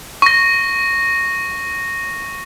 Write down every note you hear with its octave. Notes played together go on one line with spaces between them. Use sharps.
C#6 A#6